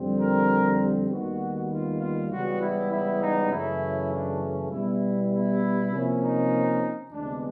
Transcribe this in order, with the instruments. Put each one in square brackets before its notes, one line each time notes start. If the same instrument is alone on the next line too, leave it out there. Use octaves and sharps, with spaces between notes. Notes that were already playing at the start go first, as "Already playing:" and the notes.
Already playing: [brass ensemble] F2 D3 G3 C4
A#4
D#2 D#3 G3 B3 F#4
F4
F4
C#2 C#3 E3 G3 B3 F#4
E4
E4
D#4
F#2 C#3 E3 A3 C#4 E4
D4
B2 G3 B3 E4
E4
C3 F3 A#3 C#4
D#4
D2 C3 E3 G#3 B3 D4